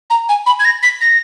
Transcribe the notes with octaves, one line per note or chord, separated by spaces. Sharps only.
A#5
G#5
B5
G#6
A#6
B6
A#6